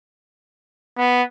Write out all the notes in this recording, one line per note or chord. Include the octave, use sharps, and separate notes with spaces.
B3